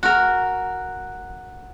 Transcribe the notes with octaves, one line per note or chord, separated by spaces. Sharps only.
F#4 A#4